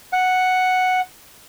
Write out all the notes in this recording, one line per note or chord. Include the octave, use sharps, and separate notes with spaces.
F#5